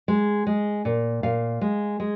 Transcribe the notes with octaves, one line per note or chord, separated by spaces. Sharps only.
G#3
G#3
A#2
A#2 F5
G#3
G#3